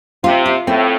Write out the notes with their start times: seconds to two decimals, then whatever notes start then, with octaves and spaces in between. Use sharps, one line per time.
0.24 C3 F4
0.46 F4
0.67 A2 C4